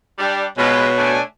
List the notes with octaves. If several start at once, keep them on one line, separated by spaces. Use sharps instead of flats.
G3 D4
B2 G#3 F4 B4 C#5
A3 D4 G#5